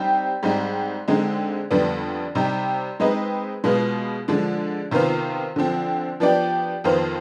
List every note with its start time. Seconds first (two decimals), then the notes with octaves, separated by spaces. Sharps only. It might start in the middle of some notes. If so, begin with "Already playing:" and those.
Already playing: G3 C4 D#4 G4
0.43 G#2 G3 C4 D#4
1.08 D3 G#3 C4 D#4
1.71 F2 D3 G3 B3 D4
2.35 C3 G3 C4 D#4 G4
3.00 G#3 C4 D#4 B4 D#5
3.64 B2 G#3 B3 F4
4.28 D3 F3 G#3 D4
4.91 C3 D#3 B3 F4 C5
5.56 D3 F3 C4
6.20 F3 B3 D4 G4 D5
6.84 F2 D#3 B3 F4 C5